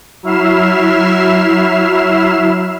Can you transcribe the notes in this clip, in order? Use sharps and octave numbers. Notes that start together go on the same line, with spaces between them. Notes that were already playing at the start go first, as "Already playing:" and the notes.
F#3 E4 E5 F6 C7 E7